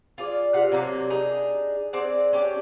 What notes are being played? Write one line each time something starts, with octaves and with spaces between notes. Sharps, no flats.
F4 G#4 D5
C3 F5 F#5
C3 F#3 A#3 D4
D4 D#4 G#4
C4 G#4 D5 F#5
C#4 D4 G4